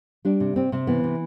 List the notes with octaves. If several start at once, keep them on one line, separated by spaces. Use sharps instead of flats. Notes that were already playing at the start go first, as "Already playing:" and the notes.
G3 D4
C3
C3 C4
C3 C4
E3 B3
C3